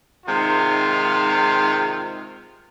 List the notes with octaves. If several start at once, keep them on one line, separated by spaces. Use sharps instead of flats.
G#2 C3 D#3 F4